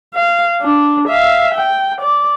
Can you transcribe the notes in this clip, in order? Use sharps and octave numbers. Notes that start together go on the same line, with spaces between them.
F5
D4
E5 F5
G5
D5